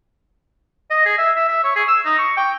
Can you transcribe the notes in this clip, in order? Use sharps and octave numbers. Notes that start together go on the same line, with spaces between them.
D#5
G#4
E5
E5
E5
C#5
G#4
E6
D#4
C#6
G5